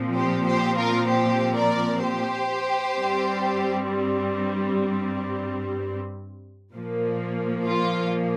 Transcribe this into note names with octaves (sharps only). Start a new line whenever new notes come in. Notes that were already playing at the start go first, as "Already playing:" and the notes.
Already playing: A#2 F3 C4
G4 C5
G4 C5
F4 A#4
G4 C5
A#4 D5
G4 C5
G2 G3 C4
A#2 F3 A#3
F4